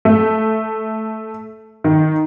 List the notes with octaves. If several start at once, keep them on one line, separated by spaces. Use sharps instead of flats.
A3
D#3